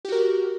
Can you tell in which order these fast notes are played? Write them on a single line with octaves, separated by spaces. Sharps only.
G4 F#4 A#4